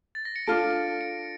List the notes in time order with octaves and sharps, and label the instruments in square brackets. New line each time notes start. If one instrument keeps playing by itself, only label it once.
[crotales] A6
A#6
C#7
[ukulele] D4 F4 A4 [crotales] D7
[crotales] C#7